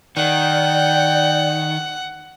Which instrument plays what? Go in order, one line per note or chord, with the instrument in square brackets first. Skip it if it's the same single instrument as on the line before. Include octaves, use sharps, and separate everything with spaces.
[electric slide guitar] D#3 [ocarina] D5 [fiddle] F#5 [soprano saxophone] G5